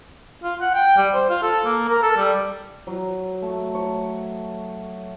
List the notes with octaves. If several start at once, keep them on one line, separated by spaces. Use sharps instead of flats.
F4
F#5
G5
G3
C5
F4
A4
A#3
A#4
A4
G3
F#3
A3
C#5